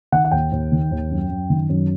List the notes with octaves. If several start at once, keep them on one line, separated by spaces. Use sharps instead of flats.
D#3 F#5
F#5
D#2 G5
D#2
D#3
D#2
F#2
F#2
D#3
F#2